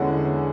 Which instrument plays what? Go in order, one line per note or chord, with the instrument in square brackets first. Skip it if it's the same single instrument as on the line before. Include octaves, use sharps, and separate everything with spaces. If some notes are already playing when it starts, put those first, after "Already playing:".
Already playing: [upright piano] E2 D3 G#3 C#4 E4 F#5